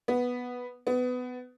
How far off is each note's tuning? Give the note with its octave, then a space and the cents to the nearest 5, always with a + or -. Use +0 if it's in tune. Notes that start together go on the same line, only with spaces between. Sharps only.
B3 -5
B3 +20